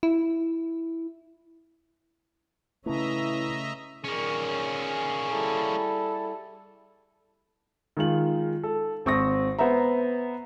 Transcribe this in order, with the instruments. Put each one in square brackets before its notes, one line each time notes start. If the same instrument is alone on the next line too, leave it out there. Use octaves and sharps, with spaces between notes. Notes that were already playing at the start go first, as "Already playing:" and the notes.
[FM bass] E4
[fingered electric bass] C#3 A3 [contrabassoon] E3 [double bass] C#4 [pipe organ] D#5 E5 A#5
[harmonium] A#2 D#3 [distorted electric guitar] A#3 C#4 [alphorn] G#4
[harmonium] G3 E4 [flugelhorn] A4
[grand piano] D#3 G#3 F4 F#7
A4
G#1 C4 C#6 D#6 A#6
B3 C5 E5 A#5